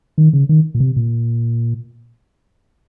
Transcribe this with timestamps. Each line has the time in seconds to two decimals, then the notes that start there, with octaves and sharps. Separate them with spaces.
0.18 D#3
0.33 C#3
0.49 D#3
0.75 A#2
0.80 C3
0.96 A#2